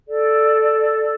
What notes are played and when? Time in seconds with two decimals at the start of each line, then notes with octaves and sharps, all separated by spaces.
0.08 A4 D5